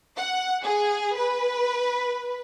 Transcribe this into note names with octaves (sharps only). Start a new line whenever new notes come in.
F#5
G#4
B4